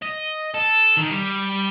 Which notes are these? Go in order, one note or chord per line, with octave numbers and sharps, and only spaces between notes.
D#5
A4
D#3
G3